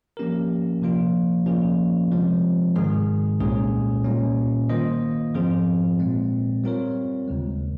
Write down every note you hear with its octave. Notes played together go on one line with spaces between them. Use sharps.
F3 A#3 C#4 G4 A#4
C3 F3 A#3 F4
C3 F3 A#3 C#4 G#4
C3 F3 G#3 C4
G#2 D#3 G#3 D#4 G#4
C2 A#2 G#3 C#4 G#4
A#2 G3 C#4
D#3 A#3 F4 C5 D#5
G#2 F3 C4 F4 G#4
A#2 G#3 C4
G3 C4 F4 A#4 C#5
D#2 C#3 G#3